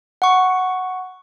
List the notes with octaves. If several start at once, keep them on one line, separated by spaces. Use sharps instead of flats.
F#5 C#6